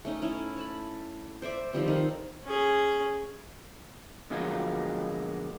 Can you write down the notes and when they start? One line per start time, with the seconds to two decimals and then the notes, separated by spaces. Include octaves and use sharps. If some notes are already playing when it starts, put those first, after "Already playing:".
0.05 A3 C#4 D#4
0.22 A3 C#4 E4 A5
0.56 C#5 A5 B5
1.42 C5 D5 E5 D6
1.73 D#3 F3 G3 C4
1.88 D#3 A4 F5
2.45 C#4 G#4
4.30 B2 D3 F3 F#3 G#3 A#3